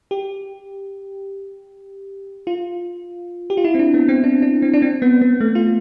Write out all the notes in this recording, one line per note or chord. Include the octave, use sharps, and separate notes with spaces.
G4
F4
G4
F4
E4
C4
D4
B3
C4
D4
D4
C4
D4
C4
B3
B3
A3
F4